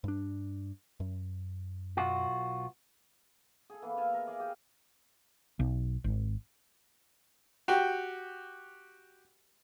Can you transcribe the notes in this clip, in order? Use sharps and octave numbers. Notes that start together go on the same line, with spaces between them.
G2 D4
F#2
B1 F4 F#4
G#4 A4
E3 A#3 B3 G#4
E5 F5 G#5 A5
A#4
G#4 D5 F5
G4 G#4 G5
B1
G#1
F#4 G4 G5